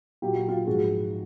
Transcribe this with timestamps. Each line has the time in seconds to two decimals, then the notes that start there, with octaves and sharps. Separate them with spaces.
0.22 A#2 F#3 G4
0.35 F#4
0.48 F4 G4
0.67 G#2 F3 F#4 G#4